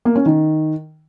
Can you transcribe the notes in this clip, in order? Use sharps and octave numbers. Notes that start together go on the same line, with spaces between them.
A#3
C#4
D#3